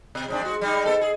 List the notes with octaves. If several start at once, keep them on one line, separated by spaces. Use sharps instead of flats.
B2
G#2 C3 D4
G#3 F#4
G3 G#3 D#4
B3 A4
G#4